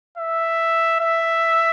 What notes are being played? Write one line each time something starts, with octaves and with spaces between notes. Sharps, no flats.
E5
E5